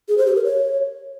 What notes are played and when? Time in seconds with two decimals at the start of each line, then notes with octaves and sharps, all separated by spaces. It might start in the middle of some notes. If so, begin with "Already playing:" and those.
0.09 G#4
0.18 C5
0.27 G4
0.36 A#4
0.45 C#5